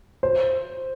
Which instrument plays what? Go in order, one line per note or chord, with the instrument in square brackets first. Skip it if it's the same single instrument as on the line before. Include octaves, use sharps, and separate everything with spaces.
[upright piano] C5